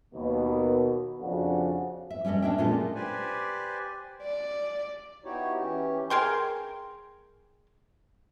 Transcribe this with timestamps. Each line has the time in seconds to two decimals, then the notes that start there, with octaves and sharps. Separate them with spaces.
0.15 D#2 B2
1.21 F2 C#3 D4 F#4 A4 F#5
2.10 E5
2.25 G3 C#4 A4 D5 D#5
2.42 C#4 D4 C#5 E5 G5
2.58 A#2 G#3 C#4 F4 A4
2.95 G4 B4 C5 D5 G#5
4.23 D5
5.25 B3 D#4 E4 F#4 G4 C#5
5.60 E3 C#4 G4
6.10 G#4 A#4 G5 C6